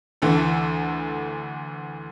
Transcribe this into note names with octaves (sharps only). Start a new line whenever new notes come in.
D2 E3 A4